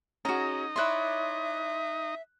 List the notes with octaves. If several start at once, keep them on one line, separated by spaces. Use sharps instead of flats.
C#4 D#4 F#4 G#4 D#5 A#5
E4 C#5 D5 E5 C6 F#6